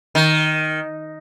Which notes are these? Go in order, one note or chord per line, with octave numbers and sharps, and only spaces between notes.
D#3